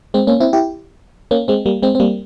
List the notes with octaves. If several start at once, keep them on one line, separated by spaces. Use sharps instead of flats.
G#3 C4
A#3 C#4
C4 E4
E4 G4
A#3 C#4
G#3 C4
G3 A#3
G#3 C4
C4
G3 A#3